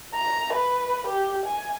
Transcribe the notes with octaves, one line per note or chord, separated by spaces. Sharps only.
A#5
B4
G4
G#5